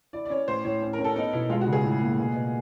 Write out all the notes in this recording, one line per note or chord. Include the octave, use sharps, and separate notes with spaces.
E4 D5
D5
C#4 C#5
A2 C5
A2 C#5
C#4
A#4
C#4
A4
B3 D#4
B2 E4
G#3 F4
F#4
C#3
G#4
A2
A#3
B2
B2